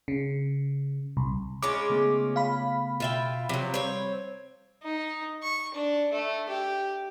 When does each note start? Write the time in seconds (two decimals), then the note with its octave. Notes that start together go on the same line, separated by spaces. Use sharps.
0.08 C#3
1.17 C2
1.63 G#3 C#4 F4 B5 D6
1.90 C#3 A3 B3
2.36 F5 B5
3.00 B2 F4 E5 G5
3.49 C3 F3 F#3
3.74 G3 C4 C#5
4.83 D#4
5.42 C#6
5.75 D4
6.12 A3
6.49 G4